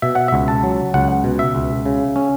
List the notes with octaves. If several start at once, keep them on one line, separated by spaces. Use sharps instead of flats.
B2 E5
F#5
E5
C#2
A5
F#3
C#2 F#5
B2
E5
C#2
C#3
C#4